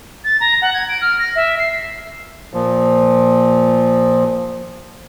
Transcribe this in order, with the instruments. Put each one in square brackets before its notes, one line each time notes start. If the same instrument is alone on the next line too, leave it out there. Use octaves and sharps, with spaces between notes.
[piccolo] A6
A#5
F#5
G#6
D7
F6
A#6
E5
C7
[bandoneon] A#2 F3